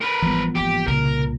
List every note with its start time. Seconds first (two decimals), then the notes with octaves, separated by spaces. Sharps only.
0.02 A#4 B4
0.22 G#1 E3 F3 G3 B3
0.56 F#1 G#2 G4
0.87 C2 A#2 C#3 A#4